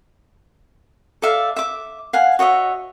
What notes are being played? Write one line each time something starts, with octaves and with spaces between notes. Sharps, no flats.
A4 D5 E5 F5
E5 D6
F5 F#5 G#5
F#4 C#5 D#5 E5